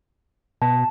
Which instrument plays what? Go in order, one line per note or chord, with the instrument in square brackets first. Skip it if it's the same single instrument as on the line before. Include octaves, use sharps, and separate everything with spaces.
[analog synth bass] B2 [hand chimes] A5